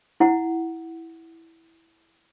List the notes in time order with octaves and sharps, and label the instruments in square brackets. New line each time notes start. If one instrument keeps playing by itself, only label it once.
[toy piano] E4 F#5